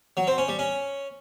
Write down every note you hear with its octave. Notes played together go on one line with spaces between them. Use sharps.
F#3
C4
C#4
G3
C#4